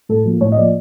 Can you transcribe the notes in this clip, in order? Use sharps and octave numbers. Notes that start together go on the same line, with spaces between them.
A2 A4
F3 A#3
A2 C#5
D#5
F3 A#3 D5